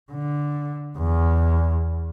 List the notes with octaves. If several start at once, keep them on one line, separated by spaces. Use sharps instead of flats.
D3
E2